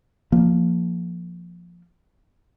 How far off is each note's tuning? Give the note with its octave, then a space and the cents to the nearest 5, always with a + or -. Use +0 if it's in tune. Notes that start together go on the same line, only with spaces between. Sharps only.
F3 +0 A#3 +0